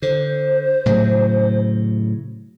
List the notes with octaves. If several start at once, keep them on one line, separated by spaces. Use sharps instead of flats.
D3 C5
A2 C#3 F#3